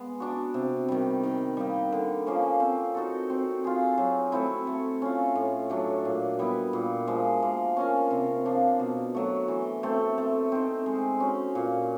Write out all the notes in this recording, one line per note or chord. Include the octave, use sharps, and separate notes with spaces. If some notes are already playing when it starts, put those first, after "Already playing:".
Already playing: G#3 B3
D4 F#4
C3
D#3 G3
D#3
G3 A#3 D#4
D3
F3 A#3 C#4
C4
D#4 F#4 A4
C4
F4 G#4
F#3
A3 C4 E4
A3
C#4 F4
A2
F#3 A3 D4
A#2
G3 B3 E4
A#2
F3 G#3
A#3
C#4 F4 A#4
C3
F3 A#3 D4
B2
F#3 A3
E3
A3 C4
A3
C4 D#4
G#3
C#4 F#4
A#2